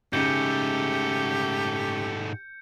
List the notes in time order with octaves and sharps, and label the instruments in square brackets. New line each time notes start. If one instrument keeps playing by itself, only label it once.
[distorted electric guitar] G#2 A3 [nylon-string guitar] C#3 D#4 G#4 [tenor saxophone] G4 [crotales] G6 C#7